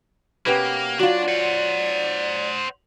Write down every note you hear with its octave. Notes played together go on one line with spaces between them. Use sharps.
B2 A#3 C#4 G4 B4 F#5
F#3 D4 F4 F#4 D5
C5 F#5